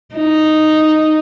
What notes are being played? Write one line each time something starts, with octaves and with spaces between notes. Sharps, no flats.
D#4